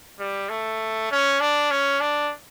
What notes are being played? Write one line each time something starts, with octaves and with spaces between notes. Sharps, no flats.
G3
A3
C#4
D4
C#4
D4